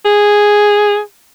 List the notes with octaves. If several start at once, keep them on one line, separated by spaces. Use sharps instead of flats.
G#4